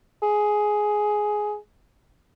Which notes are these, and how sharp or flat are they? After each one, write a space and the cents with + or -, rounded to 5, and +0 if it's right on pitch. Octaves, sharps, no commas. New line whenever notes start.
G#4 +10